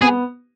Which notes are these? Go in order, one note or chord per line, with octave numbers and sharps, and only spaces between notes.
B3 G#4